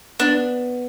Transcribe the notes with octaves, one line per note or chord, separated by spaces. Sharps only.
B3 D4